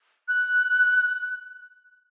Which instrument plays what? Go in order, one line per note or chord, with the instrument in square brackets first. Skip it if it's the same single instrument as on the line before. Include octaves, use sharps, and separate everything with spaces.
[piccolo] F#6